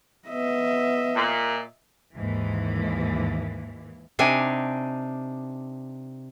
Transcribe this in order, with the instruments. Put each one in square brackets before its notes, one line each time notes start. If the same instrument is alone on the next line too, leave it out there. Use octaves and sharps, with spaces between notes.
[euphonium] B3 [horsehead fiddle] D#5 E5
[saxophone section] A#2
[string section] D#2 G#2 E3
[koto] C3 D4 D#4 G#5